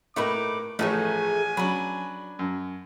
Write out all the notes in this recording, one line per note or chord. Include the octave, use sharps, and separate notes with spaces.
A2 A3 A#3 D#4 B4 D6
A1 F3 A3 D#4 G#4 C#5 G#5
F#3 C#4 D4 B4
F#2